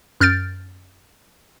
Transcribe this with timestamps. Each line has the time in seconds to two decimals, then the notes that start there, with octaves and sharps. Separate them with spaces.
0.21 F#2 F6 G6 A6 D7